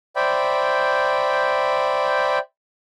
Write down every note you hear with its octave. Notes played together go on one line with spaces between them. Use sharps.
C5 D5 E5 G5 B5